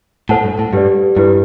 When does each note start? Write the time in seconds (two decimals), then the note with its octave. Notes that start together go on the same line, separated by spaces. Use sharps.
0.29 A2 A4 C5 F#5 A5
0.44 G2
0.59 A2
0.73 G2 G4 B4 D5
1.17 G2 E4 G4 B4